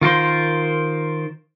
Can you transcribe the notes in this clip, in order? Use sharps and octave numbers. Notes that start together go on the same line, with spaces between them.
D#3 F4 A#4 C5